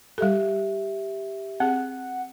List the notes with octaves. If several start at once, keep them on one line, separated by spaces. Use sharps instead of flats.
G3 G4 A4 E5
C4 G#4 F#5